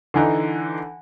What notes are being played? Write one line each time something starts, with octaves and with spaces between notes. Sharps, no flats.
D3 E3 D#4